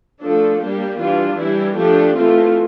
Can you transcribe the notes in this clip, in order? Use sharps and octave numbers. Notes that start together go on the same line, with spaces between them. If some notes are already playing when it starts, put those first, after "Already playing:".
F3 A3 D4 A4
G3 A#3 D4 G4
E3 G3 D4 F4
E3 G3 D4 E4
F3 A3 D4 G4
E3 A3 C4 F4